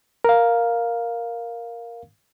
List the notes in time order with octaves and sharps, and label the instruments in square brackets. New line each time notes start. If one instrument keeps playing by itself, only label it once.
[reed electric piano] A#4 F5